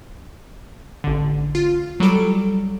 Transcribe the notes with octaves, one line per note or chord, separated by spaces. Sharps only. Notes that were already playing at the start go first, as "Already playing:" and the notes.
A1 D3
F4
F#3 G3 A4 D7